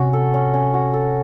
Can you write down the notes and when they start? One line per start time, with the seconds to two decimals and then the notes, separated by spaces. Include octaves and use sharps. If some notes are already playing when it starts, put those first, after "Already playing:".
Already playing: C3 C#4 F#4
0.13 A4
0.34 C#4
0.54 C#4
0.74 F#4
0.94 A4